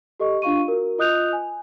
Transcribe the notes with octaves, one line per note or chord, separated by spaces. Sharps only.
G4 A4 D#5 C#6
D4 F4 F5 C#6 D#7
F#4 A#4
F4 D#5 D#6 F#6 G6 F7
G#5